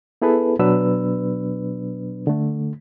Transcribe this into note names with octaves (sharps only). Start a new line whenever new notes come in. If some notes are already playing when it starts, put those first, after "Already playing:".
B3 E4 G#4 A4 B4
B2 F#3 B3 D4 B4 E6
D3 A3